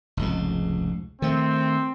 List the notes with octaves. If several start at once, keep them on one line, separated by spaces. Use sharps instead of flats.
F1 C#2 G#2
D#3 A3 C4